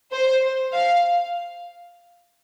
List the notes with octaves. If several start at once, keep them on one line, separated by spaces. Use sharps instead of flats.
C5
F5